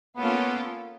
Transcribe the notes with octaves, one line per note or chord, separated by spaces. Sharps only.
A#3 B3 C#4 F4 A4